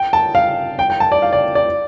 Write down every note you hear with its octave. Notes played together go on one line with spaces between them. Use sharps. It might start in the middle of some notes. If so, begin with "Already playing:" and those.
Already playing: G5
A5
F5
G5
G5
A5
D5
F5
D5
D5